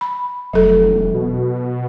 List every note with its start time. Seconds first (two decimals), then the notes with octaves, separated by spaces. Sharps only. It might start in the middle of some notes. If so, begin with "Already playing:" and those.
0.01 B5
0.53 F1 F#3 A4
0.91 E1
1.14 B2